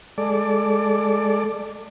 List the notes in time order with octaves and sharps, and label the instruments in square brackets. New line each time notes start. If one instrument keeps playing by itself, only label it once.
[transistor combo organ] G#3 A4 D5